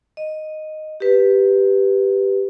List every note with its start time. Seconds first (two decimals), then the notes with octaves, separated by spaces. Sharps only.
0.17 D#5
1.00 G4 B4